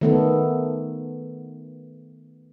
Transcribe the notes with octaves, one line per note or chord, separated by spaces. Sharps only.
D#3 A3 B3